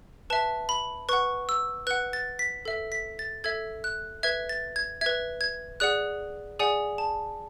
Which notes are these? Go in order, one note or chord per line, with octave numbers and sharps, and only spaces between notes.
B4 E5 A5
B5
B4 F#5 C#6
E6
B4 F#5 F#6
A6
B6
A4 E5
B6
A6
A4 E5 G#6
F#6
B4 E5 G#6
A6
G#6
B4 E5 G#6
G#6
G#4 D5 F#5 F#6
G#4 D5 F#5 G#5
A5